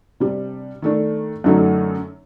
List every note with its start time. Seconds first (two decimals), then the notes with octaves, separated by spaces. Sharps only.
0.20 C3 G3 D4
0.82 D#3 A3 D4
1.44 F#2 D3 F#3 A3 D#4